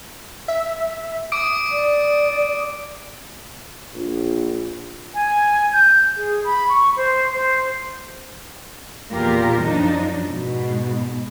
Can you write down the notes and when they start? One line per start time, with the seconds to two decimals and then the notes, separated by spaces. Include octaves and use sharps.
0.48 E5
1.32 D6 D#6 D7
1.71 D5
3.94 A#1
5.15 G#5
5.73 G6
6.17 G#4
6.44 B5
6.69 C#6
6.97 C5
7.33 C5
9.12 E2 A#2 F4 G4 A#4
9.62 F#2 F3 D4 D#4
10.24 G#2 B2